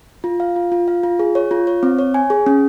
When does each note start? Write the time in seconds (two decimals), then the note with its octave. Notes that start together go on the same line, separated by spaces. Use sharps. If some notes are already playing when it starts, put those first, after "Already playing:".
0.24 F4
0.40 F5
0.56 F4
0.72 F4
0.88 F5
1.03 F4
1.19 G#4
1.35 C#5
1.51 F4
1.67 C#5
1.83 C4
1.99 C#5
2.14 G#5
2.30 G#4
2.46 C#4